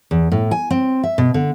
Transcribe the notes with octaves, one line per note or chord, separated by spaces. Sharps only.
E2
A2
G#5
C4
E5
B2
D3